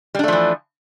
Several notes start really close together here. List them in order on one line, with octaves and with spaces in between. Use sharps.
G3 D4 A3 F3 E3